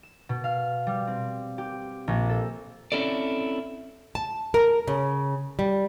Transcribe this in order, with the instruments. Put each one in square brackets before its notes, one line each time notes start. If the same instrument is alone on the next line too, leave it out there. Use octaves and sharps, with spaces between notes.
[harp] E7
B2
F5
G3
C4
G4
A#1
A4
[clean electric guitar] C4 C#4 E4 A4 D5
[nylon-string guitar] A5
A#4
C#3
G3